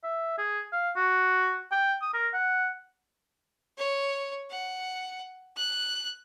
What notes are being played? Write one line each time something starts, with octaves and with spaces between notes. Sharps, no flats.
E5
G#4
F5
F#4
G5
D#6
A#4
F#5
C#5
F#5
F#6